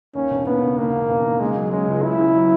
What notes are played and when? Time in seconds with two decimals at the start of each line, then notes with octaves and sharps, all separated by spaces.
0.15 D#2 C#4
0.31 E1
0.46 D#2 B3
0.62 C#3
0.78 D#2 A#3
0.93 E1
1.09 E1
1.25 D#2
1.40 C#3 G#3
1.56 F#3
1.72 G#3 C#4
1.88 C#2
2.03 C#3 E4
2.19 C#4
2.35 F#3